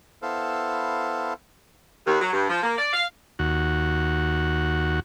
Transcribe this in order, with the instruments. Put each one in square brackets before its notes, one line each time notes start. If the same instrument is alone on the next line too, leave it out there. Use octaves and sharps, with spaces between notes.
[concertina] B3 E4 A4 C5 F5
[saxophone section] D#2
F#3
G2
F3
A#3
D5
F5
[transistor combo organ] D#2 F#4